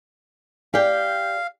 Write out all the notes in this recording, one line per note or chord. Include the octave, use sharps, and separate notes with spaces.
G4 D5 F5 G5